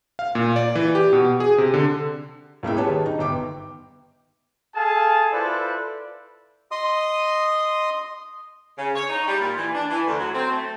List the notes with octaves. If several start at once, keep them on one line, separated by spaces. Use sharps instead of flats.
F5
A#2
D5
E3
G4
B2
G#4
C3
D3
C#2 A#3 E4 G5
G4 G#4 B4 C#5 A5
D#3
D#4
G1 G5 D6
G#4 A4 F5 G#5 A5
E4 F4 A4 B4 C5 D5
D#5 C6 D#6
C#3
C#5
D#4
G3
A#2
E3
D4
E3
D2
F#3
C4
A3